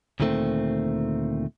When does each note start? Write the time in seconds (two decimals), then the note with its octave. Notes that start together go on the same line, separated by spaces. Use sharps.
0.20 D2 A#2 D#3 A3 B3 C4